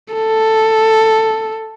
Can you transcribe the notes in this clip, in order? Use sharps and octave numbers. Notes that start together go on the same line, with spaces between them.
A4